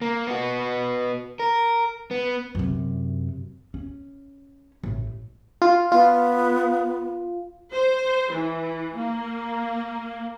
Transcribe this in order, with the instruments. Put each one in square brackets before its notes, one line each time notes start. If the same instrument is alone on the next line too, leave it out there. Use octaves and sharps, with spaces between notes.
[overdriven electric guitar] A#3
B3 F#4
A#4
B3
[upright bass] F#2 C3
C#4
A1 A3
[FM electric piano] F4
[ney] B3 [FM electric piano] F4
[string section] C5
E3
A#3